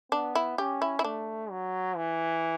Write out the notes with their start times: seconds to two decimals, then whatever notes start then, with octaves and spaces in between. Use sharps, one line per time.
0.12 B3 D4
0.35 E4
0.58 C#4 G4
0.82 E4
0.99 E4
1.04 A3 D4
1.51 F#3
1.96 E3